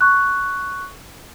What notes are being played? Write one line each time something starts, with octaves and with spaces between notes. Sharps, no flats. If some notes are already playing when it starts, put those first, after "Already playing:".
C#6 F#6